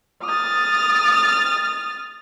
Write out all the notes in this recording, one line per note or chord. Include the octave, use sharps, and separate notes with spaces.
D#6 F6 A6